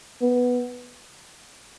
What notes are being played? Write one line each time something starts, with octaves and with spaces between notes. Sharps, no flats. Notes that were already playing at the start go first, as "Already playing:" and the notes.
B3